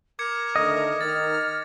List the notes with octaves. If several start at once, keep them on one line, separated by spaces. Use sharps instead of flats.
A#4 D6 G#6 C#7
D3 D#3 A3 D#5 A#6
D#3 F6 A6